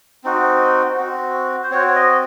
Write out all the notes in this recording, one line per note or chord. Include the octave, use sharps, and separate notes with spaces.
C4 D#4 F#4
C4 F#4
C5
C4 F#4 C#5
C#5
D#5